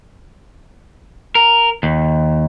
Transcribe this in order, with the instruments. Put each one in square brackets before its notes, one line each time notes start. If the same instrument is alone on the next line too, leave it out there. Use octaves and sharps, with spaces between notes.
[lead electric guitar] A#4
D#2